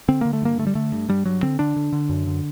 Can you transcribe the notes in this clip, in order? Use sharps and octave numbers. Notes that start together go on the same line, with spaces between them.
D3 C4
D3 A#3
A3
G2 A#3
D3 A3
G3
D3 A3
G2
G2 G3
G2 F#3
D3 C4
D3 D4
D3
D3
F#2
D3